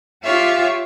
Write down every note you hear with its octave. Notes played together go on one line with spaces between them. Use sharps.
F4 G4 C#5 E5 F5